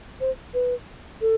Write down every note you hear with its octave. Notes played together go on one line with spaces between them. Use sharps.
C5
B4
A4